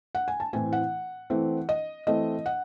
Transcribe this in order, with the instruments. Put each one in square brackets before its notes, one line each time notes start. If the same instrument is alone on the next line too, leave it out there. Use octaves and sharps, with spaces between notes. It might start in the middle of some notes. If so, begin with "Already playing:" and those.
[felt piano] F#5
G#5
A5
A2 E3 C4 G#5
F#5
E3 A3 C4
D#5
E3 A3 C4 D#5
F#5